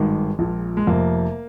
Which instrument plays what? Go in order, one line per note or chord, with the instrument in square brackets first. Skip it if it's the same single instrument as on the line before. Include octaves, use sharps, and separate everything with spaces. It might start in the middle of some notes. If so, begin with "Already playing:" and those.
Already playing: [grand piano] G#1 G2 D#3 G#3
A#1 A#2
G#3
F1 F2 C3 A#3